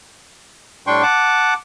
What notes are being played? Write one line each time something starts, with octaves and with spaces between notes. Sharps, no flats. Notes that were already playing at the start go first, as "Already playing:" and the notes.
A2 G3 D4 G5 C6 C#6
F#5 A5 D6